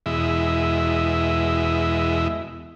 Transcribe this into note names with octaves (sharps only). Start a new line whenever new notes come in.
E2 B2 G#3 E4 D#5 E5